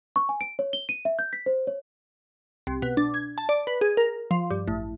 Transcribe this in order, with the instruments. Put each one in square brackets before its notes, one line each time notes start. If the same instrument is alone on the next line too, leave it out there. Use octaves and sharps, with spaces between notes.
[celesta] C#6
G#5
D7
C#5
G7
D#7
E5
G6
B6
C5
C#5
[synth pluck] C2
B2
D4
G#6
A5
D5
B4
G#4
A#4
F3
G2
A1